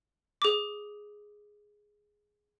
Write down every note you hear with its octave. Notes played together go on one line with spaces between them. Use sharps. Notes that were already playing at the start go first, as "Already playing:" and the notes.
G#4 D6